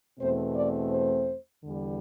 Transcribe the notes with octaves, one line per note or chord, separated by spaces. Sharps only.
E2 B2 A3 C4 C5
D5
C5
E2 D3 G3